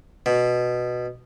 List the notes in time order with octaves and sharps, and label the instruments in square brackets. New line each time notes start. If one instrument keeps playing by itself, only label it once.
[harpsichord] B2